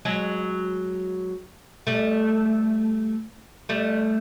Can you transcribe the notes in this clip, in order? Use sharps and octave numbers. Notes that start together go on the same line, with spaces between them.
F#3 G#3
G3 A3
G3 A3